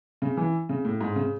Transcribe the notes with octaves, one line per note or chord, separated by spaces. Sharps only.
C#3
E3
C#3
A2
G#2
C#3